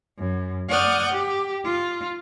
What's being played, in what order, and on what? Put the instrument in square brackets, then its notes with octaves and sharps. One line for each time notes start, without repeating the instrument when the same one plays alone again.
[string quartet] F#2
D5 F#5 C#6 D#6 F6 G6
G4
F4